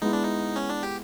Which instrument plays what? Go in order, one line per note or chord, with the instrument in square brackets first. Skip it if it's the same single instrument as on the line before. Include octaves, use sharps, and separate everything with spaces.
[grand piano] G#3 B3 E4 [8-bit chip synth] D#4
[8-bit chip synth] D4
D#4
C#4
D4
G4